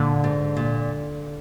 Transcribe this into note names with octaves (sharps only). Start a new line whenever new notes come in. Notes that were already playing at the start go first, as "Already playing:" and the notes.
Already playing: A#2 D3
G#2
A#2